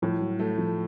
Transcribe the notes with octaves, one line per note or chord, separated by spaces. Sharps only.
A2 F3
F#3
F#3 A3
F3